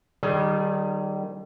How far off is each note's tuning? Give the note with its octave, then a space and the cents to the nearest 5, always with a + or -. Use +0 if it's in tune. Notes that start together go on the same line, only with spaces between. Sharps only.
D#3 -25 G3 -25 G#4 +15